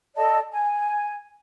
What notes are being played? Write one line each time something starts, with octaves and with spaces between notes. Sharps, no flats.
A4 D5 D#5 A5
G#5